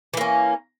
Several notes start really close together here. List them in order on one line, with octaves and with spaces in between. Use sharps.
E3 A#3 C#4